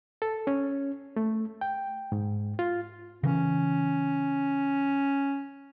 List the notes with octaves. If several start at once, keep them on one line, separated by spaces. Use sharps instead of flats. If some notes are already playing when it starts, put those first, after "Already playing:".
A4
C#4
A3
G5
G#2
F4
C#3 E3 C#4